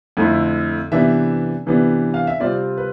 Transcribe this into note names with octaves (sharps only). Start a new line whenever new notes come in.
F2 D3 A3 E4
C3 E3 B3 D4 E5
C3 E3 B3 D4
F5
E5
C3 G3 C4 F4 D5
B4